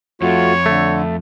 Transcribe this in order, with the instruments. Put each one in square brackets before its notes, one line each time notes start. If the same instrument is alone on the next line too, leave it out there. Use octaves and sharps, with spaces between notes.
[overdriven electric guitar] F2 [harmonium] A3 F4 F#4 [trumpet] C#5
[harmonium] D3 [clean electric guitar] A3